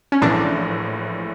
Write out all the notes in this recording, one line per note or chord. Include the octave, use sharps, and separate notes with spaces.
C#4
A#1 A2 E3 D4